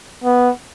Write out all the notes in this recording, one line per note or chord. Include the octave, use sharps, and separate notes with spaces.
B3